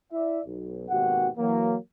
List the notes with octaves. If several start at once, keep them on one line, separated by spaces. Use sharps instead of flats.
E4 D5 E5
B1
G#1 D#2 B2 F#4 G4 F#5
E3 F#3 A#3